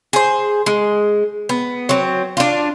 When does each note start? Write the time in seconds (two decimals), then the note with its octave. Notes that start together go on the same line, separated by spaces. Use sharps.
0.13 G#4 C5
0.66 G#3
1.49 B3
1.89 F#3 C4
2.37 D4 F4